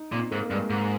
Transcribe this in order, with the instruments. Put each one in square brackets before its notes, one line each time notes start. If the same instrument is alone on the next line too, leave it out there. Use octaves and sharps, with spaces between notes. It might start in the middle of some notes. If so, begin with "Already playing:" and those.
Already playing: [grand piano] D#4
[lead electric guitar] A#2 [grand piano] C4
[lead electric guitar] G#2 [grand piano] A#3
[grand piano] A#3
[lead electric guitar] G2 [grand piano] G#3
[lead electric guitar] G#2 [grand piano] G#3